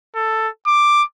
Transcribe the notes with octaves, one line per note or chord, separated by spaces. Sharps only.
A4
D6